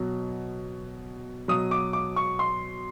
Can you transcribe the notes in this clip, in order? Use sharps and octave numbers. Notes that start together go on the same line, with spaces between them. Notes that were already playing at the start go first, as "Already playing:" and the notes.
Already playing: B2 F#3
B2 F#3 D#6
D6
D6
C#6
C6